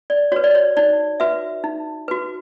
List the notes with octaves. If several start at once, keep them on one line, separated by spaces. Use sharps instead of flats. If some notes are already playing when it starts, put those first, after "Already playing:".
D5
F#4 B4 C#5
D5
C#5
D#4 D5
F#4 B4 E5
D#4
F#4 B4